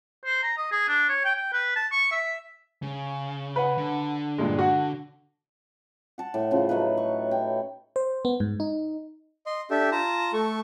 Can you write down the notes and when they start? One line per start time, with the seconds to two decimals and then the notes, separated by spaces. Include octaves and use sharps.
0.25 C5
0.43 A#5
0.57 D#5
0.71 G#4
0.88 D4
1.09 C#5
1.24 G5
1.35 G5
1.53 B4
1.76 A5
1.92 C#6
2.11 E5
2.82 C#3
3.56 B4 F#5
3.78 D3
4.38 G2 A#2 G#3
4.59 F#4 F#5
6.18 F#5 A5
6.34 A2
6.51 C#3 F3
6.69 F#3 A3 D#4 B4
6.98 C#6
7.31 G5
7.96 C5
8.25 B3
8.40 G#2
8.60 D#4
9.46 D#5 C6
9.71 D4 G4 A4 E5
9.92 F4 A5 A#5
10.33 A3 A4 C#6